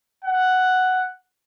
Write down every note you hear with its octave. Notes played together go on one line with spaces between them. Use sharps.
F#5